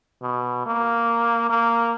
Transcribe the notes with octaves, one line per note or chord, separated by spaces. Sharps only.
B2
A#3
A#3